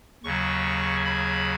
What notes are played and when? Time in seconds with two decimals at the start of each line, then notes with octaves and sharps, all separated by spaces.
0.24 D#2 C#3 F#3 C#6
1.04 B5